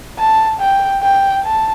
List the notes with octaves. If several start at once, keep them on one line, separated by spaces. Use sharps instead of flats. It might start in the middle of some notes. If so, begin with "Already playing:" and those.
A5
G5
G5
A5